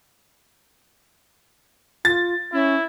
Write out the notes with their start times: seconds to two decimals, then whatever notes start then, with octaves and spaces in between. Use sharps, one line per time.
2.05 F4 A6
2.53 C#4 E4